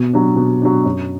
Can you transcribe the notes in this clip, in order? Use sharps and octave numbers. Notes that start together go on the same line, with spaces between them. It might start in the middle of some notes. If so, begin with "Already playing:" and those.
Already playing: B2
F#3 D4
B2
F#3 D4
F#2